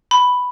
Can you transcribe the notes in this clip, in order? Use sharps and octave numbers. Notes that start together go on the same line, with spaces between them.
B5